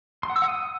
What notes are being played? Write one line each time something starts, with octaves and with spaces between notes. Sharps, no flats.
C6
F#5
E6
F#5
D#6